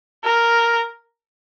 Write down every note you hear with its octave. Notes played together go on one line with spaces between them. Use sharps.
A#4